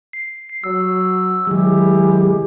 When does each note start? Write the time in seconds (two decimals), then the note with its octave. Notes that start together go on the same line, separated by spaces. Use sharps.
0.13 C7
0.64 F#3 E6
1.47 D#3 F#3 G#3 E4 G4